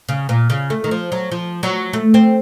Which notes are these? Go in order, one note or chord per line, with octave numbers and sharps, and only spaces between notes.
C#3
A#2
C#3
A3
D#3
F3
F#3
F3
F#3
A3
C4